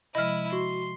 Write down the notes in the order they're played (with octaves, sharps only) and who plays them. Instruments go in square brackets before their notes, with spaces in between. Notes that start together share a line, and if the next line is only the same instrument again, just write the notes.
[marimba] C3 F3 G#3 [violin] E4 D#7 [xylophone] D#5 F6 [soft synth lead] B5
[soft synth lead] F#4 [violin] C6